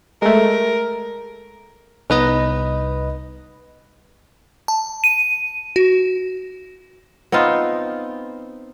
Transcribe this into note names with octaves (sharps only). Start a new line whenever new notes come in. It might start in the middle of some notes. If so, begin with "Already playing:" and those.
G#3 A3 A#4
C2 B3 D#4 B4 D#5
A5
D#7
F#4
B3 C4 D#4 F4